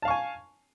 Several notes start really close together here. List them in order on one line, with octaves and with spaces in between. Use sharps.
A5 F5 C#6 G#5